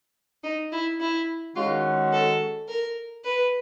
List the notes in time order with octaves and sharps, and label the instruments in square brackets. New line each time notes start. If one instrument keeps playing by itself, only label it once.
[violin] D#4
E4
E4
[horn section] D#3 G#3 C#4 F#4 [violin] F4
[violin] A4
A#4
B4